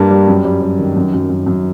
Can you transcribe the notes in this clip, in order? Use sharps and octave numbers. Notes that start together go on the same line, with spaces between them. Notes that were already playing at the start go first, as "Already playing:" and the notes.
Already playing: G2 G3 A#3
G3
F#2
G3
G3
D#3
F#2
F#2
F#2
F#2